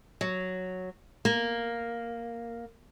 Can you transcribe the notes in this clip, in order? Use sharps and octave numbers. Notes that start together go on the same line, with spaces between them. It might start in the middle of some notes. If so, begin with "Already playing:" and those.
F#3
A#3